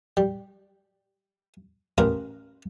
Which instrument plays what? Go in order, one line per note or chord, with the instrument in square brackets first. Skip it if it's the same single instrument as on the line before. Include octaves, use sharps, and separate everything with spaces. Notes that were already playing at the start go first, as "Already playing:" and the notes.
[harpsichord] G3
A1 A#4 B4 F5 C6